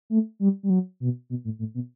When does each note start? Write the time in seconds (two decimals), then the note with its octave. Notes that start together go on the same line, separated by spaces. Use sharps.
0.10 A3
0.40 G3
0.63 G3
0.70 F#3
1.00 B2
1.30 B2
1.45 A2
1.59 A2
1.75 B2